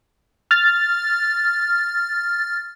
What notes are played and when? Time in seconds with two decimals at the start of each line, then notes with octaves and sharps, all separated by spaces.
0.51 F6 A6